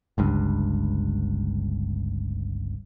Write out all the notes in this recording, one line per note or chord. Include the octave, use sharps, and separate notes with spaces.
G1 C#2 G2